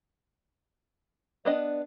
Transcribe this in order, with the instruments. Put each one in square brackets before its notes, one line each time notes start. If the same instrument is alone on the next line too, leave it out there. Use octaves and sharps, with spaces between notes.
[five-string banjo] B3 D4 D#5 [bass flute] D5